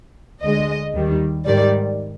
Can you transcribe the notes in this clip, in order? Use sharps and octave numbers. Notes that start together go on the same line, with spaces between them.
D2 D3 G#3 D#5
D#2 D#3 G3
G#2 D#3 G3 D5